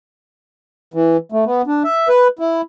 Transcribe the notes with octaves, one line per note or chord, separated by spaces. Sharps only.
E3
A3
B3
D4
E5
B4
E4